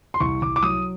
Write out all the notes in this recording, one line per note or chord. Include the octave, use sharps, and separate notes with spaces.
C6
C2 C#6
C2 D6
D6
F#3 D#6